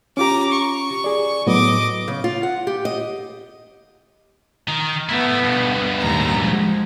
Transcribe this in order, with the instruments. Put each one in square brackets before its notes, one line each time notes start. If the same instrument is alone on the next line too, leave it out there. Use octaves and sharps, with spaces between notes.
[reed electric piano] C#4 F4 G4 [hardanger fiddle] A#5 D6
[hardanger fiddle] C#6
[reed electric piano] G#4 D5
[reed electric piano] A2 F#3 B3 [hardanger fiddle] D#5 D6
[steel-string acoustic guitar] C#3
F4
F#5
G4
D#5
[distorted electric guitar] D#3
[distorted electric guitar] A3 E4 [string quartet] B3
[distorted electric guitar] G2 B2
[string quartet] D#2 A2 A#5
F3 G#3